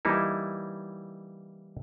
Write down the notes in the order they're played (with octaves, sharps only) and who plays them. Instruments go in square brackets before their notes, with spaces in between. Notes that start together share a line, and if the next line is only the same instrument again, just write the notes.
[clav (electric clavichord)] E3 G3 A#3 D#4 E4